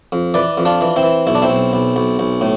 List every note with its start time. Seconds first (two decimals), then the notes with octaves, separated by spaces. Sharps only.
0.12 F2
0.34 E3 B4 D5
0.58 F2
0.65 D4 F4
0.81 E3
0.96 C4 E4
1.03 E3
1.27 B1 E4
1.35 D4
1.42 C4 E4
1.50 B1
1.73 B1
1.96 B1
2.19 B1
2.41 A2